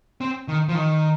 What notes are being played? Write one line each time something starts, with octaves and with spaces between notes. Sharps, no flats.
C4
D#3
F3
D#3